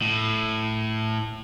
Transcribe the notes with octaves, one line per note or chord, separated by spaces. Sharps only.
A2